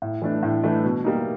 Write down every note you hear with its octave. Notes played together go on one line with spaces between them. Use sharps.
A2
E3 A3 D4
A2
E3 A3 D4
B2
G3 A#3 D#4